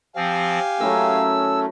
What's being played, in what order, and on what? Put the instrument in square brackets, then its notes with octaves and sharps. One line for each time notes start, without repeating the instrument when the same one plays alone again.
[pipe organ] F3 C4 [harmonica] G4 F5 G#5
[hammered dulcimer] F#3 E4 A#4 [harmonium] A3 C#4 [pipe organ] E6